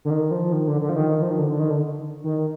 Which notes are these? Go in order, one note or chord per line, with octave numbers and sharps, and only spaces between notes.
D3
D#3
F3
D#3
D3
D3
F3
D#3
F3
D#3
D3
D3
D#3
D3
D#3